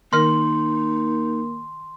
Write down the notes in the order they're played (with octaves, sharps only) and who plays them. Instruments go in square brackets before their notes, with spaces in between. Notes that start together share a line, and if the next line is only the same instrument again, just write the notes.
[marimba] D#3 A#4 F6 [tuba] A#3 [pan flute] D#4 [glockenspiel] C6